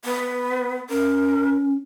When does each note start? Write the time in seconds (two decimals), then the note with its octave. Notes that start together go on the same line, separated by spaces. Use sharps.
0.05 B3
0.90 C#4 A#4